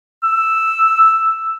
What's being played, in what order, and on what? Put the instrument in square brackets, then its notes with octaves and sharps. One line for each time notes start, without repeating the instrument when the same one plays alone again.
[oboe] E6